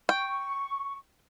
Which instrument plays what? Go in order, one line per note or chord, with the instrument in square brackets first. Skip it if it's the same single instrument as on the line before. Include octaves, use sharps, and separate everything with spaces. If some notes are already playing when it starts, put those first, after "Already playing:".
[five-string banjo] G5 [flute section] C#6